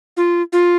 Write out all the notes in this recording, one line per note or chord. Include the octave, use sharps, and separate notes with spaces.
F4
F4